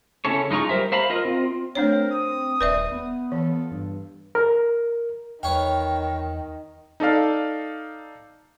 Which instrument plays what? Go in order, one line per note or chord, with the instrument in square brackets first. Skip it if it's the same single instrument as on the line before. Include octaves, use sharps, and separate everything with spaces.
[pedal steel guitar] C#3 C#4 E4 A4 C#5
G#3 D#4 F4 A#5 C#6
G3 A#4 C5 E5
C5 E5 F5 A#5 B5
F4 A#4 D#5
C4 F4
[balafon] A3 D4 C#5 [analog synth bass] C4 [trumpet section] A#4
[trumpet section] D#6
[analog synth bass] D#1 [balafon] B4 D5 E5
[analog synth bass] B3
[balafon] E3 [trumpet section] F4 A4
[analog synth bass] G2
[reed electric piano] A#4
[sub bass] E2 [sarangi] D#3 [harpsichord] B4 C#5 F5 [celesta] G5
[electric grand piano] D#4 A4 D5 F5